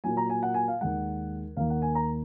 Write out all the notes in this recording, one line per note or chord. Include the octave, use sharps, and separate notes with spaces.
A#2 F#3 A#3 G#5
A#5
G#5
F#5
G#5
F5
D#2 D#3 G#3 F#5
D#2 D#3 A#3 F5
F#5
G#5
A#5